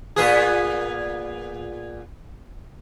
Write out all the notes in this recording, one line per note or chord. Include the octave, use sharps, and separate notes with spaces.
A#2 B3 G#4